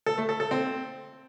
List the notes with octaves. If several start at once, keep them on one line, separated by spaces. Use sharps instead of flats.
A4
A3
A4
A4
C4